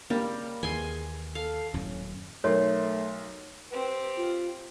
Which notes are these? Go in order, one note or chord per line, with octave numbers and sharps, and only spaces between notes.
C#3 G3 A#3
D#2 E3 G#4 G#5 C6
A4 F5
D#1 F#2 A2 C#4
B1 A3 A4 A#4 C#5 C6
C4 G4 B4
F4